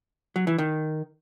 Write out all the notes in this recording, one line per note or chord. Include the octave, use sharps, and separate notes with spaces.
F#3
E3
D#3